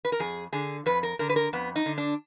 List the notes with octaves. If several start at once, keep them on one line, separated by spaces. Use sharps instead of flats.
B4
A#4
F2 G#4
D3 G#4
F2 B4
A#4
D3 A#4
B4
A#4
F2 B3
D#4
D3
D4